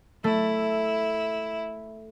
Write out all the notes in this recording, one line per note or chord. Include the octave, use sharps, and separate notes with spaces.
A3 E4